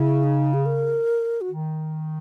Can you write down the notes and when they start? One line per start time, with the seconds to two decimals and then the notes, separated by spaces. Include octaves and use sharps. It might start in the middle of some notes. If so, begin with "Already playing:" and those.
Already playing: C#3 E4
0.24 D#4
0.54 G#4
0.66 A#4
1.41 F#4
1.50 D#3